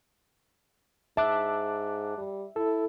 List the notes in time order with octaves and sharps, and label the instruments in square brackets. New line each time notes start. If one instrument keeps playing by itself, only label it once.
[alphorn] G#2 [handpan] E5 [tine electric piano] A5 D6 F#6
[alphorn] G3
[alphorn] E4 [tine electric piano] A4